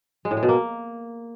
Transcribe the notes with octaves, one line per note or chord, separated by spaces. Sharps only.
G#3
A2
G#3
B2
A#3